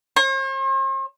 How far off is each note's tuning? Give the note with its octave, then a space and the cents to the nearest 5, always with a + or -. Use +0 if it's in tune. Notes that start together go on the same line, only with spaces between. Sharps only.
C5 +45